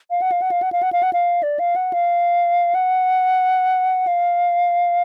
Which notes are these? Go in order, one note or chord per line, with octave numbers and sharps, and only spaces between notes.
F5
F#5
F5
F#5
F5
F#5
F5
F#5
F5
F#5
F5
D5
F5
F#5
F5
F#5
F5